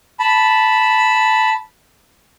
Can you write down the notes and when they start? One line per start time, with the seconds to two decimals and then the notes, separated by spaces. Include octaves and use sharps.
0.19 A5 B5